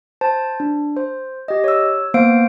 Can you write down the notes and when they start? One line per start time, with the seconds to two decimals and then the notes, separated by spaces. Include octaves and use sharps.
0.21 C5 A5
0.60 D4
0.97 C5
1.48 G4 D#5
1.64 C#5 E6
2.14 A#3 B3 C5 F5 D7